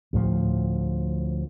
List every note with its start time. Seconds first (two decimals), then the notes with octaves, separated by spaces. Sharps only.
0.13 D2 A2 F3